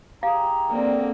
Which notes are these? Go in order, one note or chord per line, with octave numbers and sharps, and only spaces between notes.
G4 G#4 F5 A#5
D3 A#3 C4